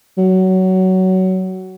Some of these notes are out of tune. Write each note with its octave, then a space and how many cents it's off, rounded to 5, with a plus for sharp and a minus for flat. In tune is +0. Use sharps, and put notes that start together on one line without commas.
F#3 +15